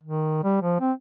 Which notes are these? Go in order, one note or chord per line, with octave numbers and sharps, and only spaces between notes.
D#3
G3
F3
C4